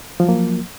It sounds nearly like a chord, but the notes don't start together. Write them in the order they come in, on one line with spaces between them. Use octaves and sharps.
F3 F#3 A#3